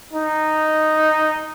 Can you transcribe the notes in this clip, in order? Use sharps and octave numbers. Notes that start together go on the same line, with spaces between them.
D#4